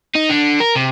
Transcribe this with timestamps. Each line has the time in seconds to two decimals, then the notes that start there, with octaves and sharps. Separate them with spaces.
0.15 D#4
0.30 D3
0.60 A#4
0.76 C3